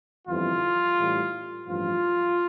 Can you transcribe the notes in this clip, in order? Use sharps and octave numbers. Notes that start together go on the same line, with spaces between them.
G1 F2 E3 G3 F4
A1 A2 E3 G3
A1 G2 F3 F4